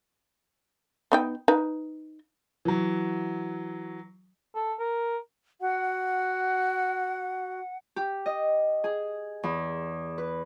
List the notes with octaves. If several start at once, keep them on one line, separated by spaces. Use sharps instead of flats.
B3 D#4 G5
D#4 B4
E3 F#3
A4
A#4
F#4 F#5
G4
D#5
G#4
E2
B4